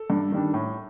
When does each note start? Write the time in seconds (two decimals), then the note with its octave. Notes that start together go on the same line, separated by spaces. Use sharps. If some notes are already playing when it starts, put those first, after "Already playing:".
Already playing: A4
0.10 G2
0.32 D#3 G3 D4
0.54 A2